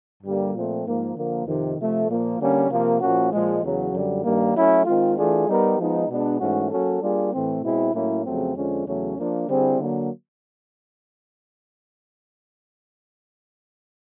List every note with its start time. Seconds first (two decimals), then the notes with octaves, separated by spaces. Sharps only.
0.23 G2 D3 G3 A#3
0.54 A#2 F3 A3 C4
0.86 G#2 F3 A#3
1.16 D3 F3 A#3
1.46 F2 C3 D#3
1.78 C3 F3 A3
2.08 A#2 F3 A#3
2.39 D3 G3 A#3 C#4
2.70 C3 F3 A#3
3.01 A#2 F3 A#3 C#4 F#4
3.32 A#2 F3 G#3
3.63 E2 C#3 F#3
3.93 F#2 D3 G3
4.24 G2 D#3 G3 A#3
4.54 F#3 A3 C#4 E4
4.86 D#3 G#3 C4 F4
5.16 E3 A3 D4 F4 G#4
5.48 G3 B3 D#4 G4 A#4
5.79 F3 G#3 B3 D#4
6.09 B2 G#3 B3 D4
6.40 G#2 E3 A3 C#4 F#4
6.71 F#3 A#3 C#4 F#4 A4
7.02 G3 A#3 D4 F4 G#4
7.33 A2 E3 A3 C4
7.63 B2 G#3 C4 E4
7.94 A2 F#3 A#3 C#4 E4
8.25 F2 C#3 F#3 A3 C4
8.55 F2 D3 F3 G#3 C#4
8.86 E2 C#3 F#3 A3 C#4
9.17 F3 A#3 D4
9.48 D3 G3 C4 E4 G#4
9.79 D3 F#3 A#3